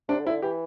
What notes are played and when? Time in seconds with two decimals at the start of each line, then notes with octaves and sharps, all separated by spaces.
0.09 C3 D4
0.20 D3
0.26 C3 E4
0.31 D3
0.42 E3 G4